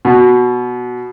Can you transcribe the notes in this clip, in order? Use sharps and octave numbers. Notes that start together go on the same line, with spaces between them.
B2